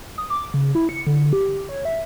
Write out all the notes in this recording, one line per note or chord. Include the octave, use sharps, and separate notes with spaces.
D#6
D6
C#3
E4
C#7
D3
G4
C#5
E5